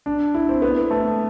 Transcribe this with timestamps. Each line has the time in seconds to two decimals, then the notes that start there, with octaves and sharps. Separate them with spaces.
0.06 D4
0.34 E4
0.49 C4
0.62 B3
0.91 A3